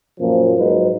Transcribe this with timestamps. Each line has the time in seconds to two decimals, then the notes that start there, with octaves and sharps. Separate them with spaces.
0.19 F#2 A#2 F3
0.58 G#2 F#3 D#4 B4